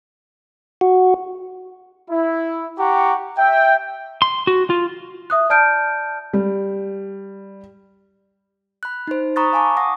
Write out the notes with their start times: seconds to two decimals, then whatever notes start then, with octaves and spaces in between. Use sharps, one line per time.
0.81 F#4
2.09 E4
2.78 G4 F#5 A#5 C#6
3.37 E5 G5
4.22 C6
4.47 F#4
4.70 F4
5.30 E5 D#6 F#6
5.50 D5 A5 F6 G6 D7
6.33 G3
8.83 B5 F#6
9.07 D#4 C5
9.36 A#5 B5 C#6 D#6 F#6 A6
9.53 F5 G#5 A5 C#6 D6
9.77 F#5 D#6 A#6